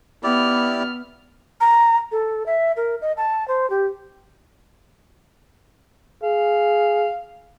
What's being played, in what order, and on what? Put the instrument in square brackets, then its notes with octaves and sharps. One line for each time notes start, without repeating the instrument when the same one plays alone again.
[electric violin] B3 F6 [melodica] E4 G4 D5
[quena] A#5
A4
E5
A#4
D#5
A5
C5
G4
[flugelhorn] G#4 [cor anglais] F5